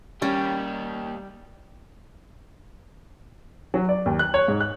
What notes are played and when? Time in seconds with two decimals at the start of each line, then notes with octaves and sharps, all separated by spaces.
0.22 G3 A#3 C#4 G4
3.74 F#3
3.89 D5
4.06 D#2
4.19 F#6
4.34 C#5
4.48 G#2
4.61 F#6